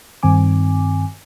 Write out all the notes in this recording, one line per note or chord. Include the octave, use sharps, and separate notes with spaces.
G2 D#3 C4 G#5 D6